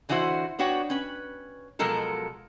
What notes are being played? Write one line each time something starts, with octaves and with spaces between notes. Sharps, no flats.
D3 E3 D4 E4 F#4 C5
B3 D4 F#4 C#5 F#5 G5
C#4 B4
B2 F3 F#3 G#3 A4 A#4